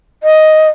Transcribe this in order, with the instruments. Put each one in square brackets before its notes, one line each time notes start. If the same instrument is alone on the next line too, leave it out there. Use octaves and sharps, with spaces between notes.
[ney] D#5